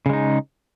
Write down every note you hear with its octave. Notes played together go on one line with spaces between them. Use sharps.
C#3 G#3 D#4